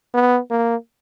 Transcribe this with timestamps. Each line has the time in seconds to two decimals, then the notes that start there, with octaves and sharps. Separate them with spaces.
0.14 B3
0.50 A#3